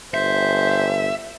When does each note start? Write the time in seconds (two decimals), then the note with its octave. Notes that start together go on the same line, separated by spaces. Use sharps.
0.14 G1 C5 E5